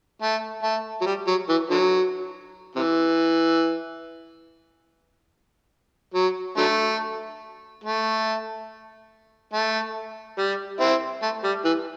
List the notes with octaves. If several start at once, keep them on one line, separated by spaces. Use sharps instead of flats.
A3
A3
F#3
G3
F#3
E3
D3 F#3
C3 E3
F#3
D3 F#3 A3
A3
A3
G3
C4 E4
A3
G3
E3